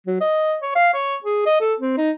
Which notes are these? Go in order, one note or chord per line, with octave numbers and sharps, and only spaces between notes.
F#3
D#5
C#5
F5
C#5
G#4
D#5
A4
C4
D#4